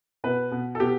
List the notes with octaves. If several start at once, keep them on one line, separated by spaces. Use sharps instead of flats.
B2 B4
B2
A4
B2 G4